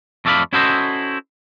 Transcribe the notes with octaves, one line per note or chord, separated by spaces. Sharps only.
F2 A3 A4 D5 F5 B5
C#4 E4 F#4 A4 C5 D#5